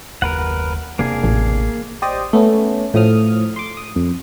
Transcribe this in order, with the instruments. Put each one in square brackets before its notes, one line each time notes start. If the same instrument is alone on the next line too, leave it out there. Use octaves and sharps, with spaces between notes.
[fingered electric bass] F#1 D#2 [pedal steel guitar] A#4 B4 F#5
[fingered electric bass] E1 C3 D4 [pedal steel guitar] A#3 G#4
[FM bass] A1
[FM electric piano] G4 C5 D5 D#5 D#6
A3 B3 C#4
A2 F3 D#6 F6
C6 D6
D#6
F2